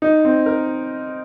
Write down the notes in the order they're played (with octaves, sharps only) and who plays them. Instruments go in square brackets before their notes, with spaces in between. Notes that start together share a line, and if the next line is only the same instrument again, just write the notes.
[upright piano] D#4
C4
A#4